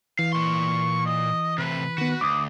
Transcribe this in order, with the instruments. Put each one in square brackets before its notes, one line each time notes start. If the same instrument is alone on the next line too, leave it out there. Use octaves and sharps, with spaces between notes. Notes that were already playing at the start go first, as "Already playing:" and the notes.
[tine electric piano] E3 [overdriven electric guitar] F5
[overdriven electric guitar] A#2 C6 [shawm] C#6
[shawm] D#5
[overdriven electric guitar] A2 C3 [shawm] B4
[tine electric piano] D#3 B3 [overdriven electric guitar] F#4
[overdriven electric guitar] D2 [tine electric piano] D6 D#6